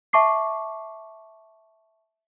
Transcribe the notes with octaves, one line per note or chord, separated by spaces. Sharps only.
E5 A5 C#6 D6 C7